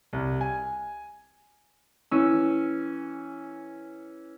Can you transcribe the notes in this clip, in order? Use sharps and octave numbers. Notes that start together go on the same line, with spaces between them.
C2
G#5
E3 C#4 E6